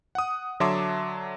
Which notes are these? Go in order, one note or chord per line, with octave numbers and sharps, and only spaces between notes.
F#5 D#6
D3 F#3 E5 A5 C6 D6